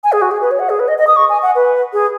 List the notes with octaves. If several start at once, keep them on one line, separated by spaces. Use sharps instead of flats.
G#5
G#4
F#4
G#4
B4
C#5
F#5
G#4
B4
D#5
D#5
D#6
C#6
G#5
F#5
B4
G#4